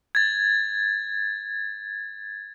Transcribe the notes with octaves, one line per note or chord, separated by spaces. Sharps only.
G#6 A6